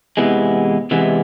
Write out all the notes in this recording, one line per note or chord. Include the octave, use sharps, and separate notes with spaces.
E2 C3 E3 G#3 B3
E2 C3 E3 G#3 B3